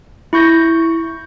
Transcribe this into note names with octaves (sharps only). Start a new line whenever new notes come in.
E4 C#6 G6 A#6